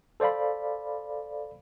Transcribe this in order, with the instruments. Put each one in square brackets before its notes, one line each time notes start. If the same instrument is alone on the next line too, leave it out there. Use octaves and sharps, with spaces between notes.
[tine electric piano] A4 C5 D5 F5 B5